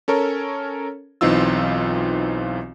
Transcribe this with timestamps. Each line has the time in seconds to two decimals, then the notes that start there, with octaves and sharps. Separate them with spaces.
0.08 C#4 A4 A#4 C#5
1.21 B1 E3 C4 D#4 F4 E6